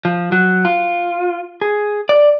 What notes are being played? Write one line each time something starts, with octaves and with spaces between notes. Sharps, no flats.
F3
F#3
F4
G#4
D5